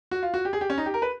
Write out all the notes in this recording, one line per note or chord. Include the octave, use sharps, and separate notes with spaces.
F#4
F4
F#4
G4
G#4
G4
C#4
D#4
G4
A#4
B4